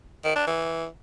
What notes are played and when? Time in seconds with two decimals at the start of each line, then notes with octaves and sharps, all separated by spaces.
0.24 D#3
0.36 D4
0.47 E3